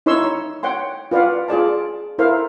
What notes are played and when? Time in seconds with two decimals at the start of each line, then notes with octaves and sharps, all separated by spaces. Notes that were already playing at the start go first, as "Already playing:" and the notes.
0.06 D#4 E4 C#5 C6 C#6 E6
0.63 C#5 F#5 G5 C6
1.11 F4 B4 D5 F5 F#5
1.48 F4 G#4 D5 A5
2.19 E4 A4 A#4 C5 E5 F5